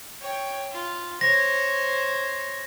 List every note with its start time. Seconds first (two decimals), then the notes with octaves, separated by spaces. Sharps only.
0.22 C#5 G5
0.71 F4
1.21 C5 C#5 A#6